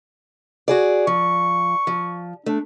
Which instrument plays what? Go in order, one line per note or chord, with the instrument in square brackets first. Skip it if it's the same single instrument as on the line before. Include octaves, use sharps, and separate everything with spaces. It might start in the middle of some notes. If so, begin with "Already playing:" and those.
[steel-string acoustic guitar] F#4 G#4 D5
[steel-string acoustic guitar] F3 [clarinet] C#6
[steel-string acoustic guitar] F3
[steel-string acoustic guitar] A3 [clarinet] D4